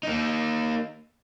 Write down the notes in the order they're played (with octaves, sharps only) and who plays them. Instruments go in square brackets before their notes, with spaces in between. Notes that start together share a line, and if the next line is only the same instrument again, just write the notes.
[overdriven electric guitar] A#3 D#4